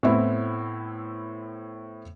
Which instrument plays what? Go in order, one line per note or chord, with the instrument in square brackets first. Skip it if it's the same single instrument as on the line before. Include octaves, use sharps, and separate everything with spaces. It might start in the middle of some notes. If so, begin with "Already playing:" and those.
[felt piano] A2 B3 C4 E4